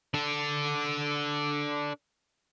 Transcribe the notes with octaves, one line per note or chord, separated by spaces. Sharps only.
D4 A4